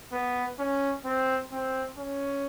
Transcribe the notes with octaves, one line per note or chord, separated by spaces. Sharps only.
B3
C#4
C4
C4
C#4